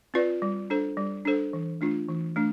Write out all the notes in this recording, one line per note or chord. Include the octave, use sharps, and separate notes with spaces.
C4 F4 B4 D5
G3
D4 A4 C5
G3
D4 A4 C5
E3
A3 D4 F4
E3
A3 D4